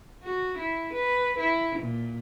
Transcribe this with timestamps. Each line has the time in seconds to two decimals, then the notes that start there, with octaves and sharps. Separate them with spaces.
0.23 F#4
0.58 E4
0.93 B4
1.39 E4
1.79 A#2